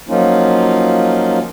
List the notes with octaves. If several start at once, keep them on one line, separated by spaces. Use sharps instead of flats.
F3 F#3 A#3 C#4 D#4 F4